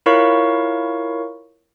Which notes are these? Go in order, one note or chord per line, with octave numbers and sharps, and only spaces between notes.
E4 F4 A#4 C#5 F5 C#6